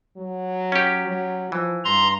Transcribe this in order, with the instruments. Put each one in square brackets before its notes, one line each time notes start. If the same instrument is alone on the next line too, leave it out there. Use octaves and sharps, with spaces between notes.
[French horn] F#3
[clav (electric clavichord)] C#4 G4
[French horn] F#3
[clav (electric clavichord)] E3 [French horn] F3
[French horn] G2 [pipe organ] A#5 C6